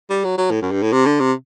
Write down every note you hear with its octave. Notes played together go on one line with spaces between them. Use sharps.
G3
F#3
F#3
A2
F#2
G2
A2
C3
D3
C3